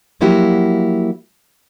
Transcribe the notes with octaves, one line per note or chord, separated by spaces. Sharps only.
F3 F#3 A#3 E4 F#4 G4